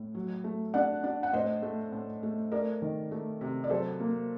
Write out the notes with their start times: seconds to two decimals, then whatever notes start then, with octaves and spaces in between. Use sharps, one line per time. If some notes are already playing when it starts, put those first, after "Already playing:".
Already playing: A2
0.15 F#3
0.44 A3
0.74 D4 D5 F#5
1.04 D4
1.23 F#5
1.33 A2 C5 D#5
1.62 A3
1.92 A2
2.23 A3
2.52 A3 A#4 D5
2.82 D#3
3.11 A3
3.41 C3
3.64 D5
3.70 F#3 A4 C5
4.00 A#3